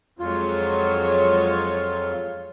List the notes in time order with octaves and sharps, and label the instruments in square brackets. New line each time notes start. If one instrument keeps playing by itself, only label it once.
[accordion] F2 F4 [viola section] F#3 G#3 C#5